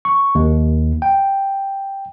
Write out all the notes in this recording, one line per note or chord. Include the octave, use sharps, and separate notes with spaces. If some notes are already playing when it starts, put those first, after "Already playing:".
C#6
D#2
G5